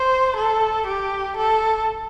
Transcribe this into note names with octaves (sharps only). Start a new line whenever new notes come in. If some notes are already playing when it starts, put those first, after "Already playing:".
Already playing: C5
A4
G4
A4